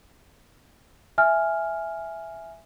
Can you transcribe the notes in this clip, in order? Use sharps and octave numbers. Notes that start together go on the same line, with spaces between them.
E5 G#5 F6